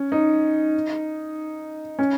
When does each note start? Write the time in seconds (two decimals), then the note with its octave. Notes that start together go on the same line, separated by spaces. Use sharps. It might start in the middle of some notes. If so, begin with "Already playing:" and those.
Already playing: C#4
0.12 D#4
1.99 C#4